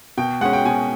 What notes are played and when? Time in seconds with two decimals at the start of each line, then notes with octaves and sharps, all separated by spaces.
0.17 B2 G5
0.41 G#3 C#4 F#5
0.53 G5
0.65 B2 G#5